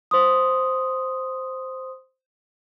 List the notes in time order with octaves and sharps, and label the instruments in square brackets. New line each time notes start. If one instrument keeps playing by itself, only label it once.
[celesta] C5 C6 D#6